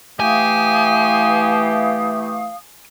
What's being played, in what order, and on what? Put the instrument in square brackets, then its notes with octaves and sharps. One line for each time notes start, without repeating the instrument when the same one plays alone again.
[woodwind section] E3 A3 [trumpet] G4 [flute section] F5 D#6 [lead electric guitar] G#5